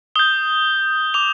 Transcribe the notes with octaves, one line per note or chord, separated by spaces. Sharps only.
D#6 G6 G7
D6 F7